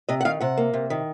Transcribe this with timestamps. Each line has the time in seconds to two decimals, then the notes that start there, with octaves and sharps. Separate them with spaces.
0.09 C3 D#5
0.21 F#5
0.25 D#3 F5
0.40 C3 F#5
0.57 A#3
0.73 C3
0.90 D#3